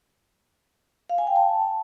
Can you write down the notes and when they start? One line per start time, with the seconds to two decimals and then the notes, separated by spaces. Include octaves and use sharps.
1.09 F5
1.18 G#5
1.27 G5
1.36 A5